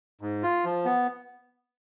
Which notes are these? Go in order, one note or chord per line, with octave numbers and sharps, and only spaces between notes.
G#2
F4
F3
B3